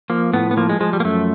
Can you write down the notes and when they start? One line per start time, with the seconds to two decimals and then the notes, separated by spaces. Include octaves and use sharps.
0.10 F3 A#3
0.33 A2 B3
0.51 B3
0.57 F3 A#3
0.69 G#3
0.80 F3 G#3
0.93 G3
1.00 A#3
1.05 F#2 A3